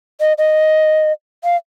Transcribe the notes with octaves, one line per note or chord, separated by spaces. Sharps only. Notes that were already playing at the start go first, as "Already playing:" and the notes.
D#5
D#5
F5